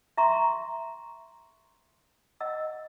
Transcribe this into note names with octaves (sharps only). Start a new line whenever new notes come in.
E5 A#5 C6 C#6
D#5 F#5 E6